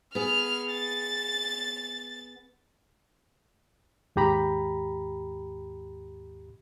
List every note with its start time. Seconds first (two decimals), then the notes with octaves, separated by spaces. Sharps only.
0.15 B3 G#4 F6
0.71 A6
4.16 D#2 G#2 G4 A#5 B5